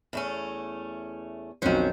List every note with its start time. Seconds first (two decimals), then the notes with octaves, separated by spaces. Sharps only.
0.13 E2 A3 C#4
1.62 B1 F2 D#3 F#3 C#4 C5